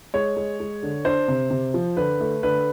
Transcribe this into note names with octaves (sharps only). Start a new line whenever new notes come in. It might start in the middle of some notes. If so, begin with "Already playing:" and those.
G#3 C#5
G#3
G#3
D3
D4 C5
C3
C3
F3
D3 B4
A3
D3 B4